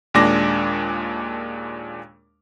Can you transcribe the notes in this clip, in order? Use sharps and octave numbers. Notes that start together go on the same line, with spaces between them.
D#2 A#2 G#3 D4 D6 A#6